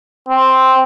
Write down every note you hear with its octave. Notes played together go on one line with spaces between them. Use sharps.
C4